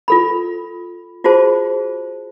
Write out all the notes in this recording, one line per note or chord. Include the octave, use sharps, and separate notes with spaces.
F4 A4 B5
F4 F#4 G#4 C5 A5